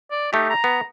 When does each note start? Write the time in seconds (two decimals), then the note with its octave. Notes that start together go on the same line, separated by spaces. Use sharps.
0.11 D5
0.33 A3 D#4 G4
0.50 A#5
0.64 B3